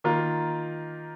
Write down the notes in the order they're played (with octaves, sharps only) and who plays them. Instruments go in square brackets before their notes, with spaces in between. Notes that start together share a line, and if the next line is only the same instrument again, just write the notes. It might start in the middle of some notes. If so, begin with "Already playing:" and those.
[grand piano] D#3 A#3 F4